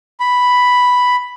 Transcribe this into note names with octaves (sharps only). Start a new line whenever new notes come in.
B5